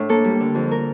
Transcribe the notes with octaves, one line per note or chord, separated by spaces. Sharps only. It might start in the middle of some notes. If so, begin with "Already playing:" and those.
Already playing: A2 D4
A#3 A4
G3
D3
F2
A#4